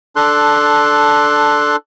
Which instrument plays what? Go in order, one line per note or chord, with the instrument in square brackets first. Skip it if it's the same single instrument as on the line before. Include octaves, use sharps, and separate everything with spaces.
[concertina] D4 A4 C6 F#6